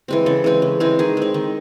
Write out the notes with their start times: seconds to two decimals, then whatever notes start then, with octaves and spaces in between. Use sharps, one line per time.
0.08 E3 G#3 C4
0.26 C#3 A4
0.44 E3 G#3 C4
0.62 C#3
0.80 E3 G#3 C4
0.99 D#3 G#4
1.17 G#3 C4
1.34 D#3